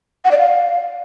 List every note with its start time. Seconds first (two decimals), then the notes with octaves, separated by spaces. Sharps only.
0.24 F#5
0.31 D5
0.38 F5